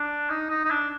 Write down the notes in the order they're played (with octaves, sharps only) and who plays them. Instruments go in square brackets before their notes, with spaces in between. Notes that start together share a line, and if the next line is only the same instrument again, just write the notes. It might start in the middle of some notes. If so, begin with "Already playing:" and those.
Already playing: [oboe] D4
D#4
D#4
D#4
D4